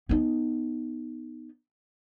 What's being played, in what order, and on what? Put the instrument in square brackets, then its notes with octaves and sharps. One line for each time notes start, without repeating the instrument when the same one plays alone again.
[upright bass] B3 D#4